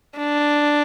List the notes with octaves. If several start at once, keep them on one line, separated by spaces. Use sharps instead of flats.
D4